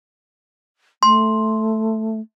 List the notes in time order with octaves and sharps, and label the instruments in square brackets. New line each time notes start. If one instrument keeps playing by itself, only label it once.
[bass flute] A3 [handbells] C6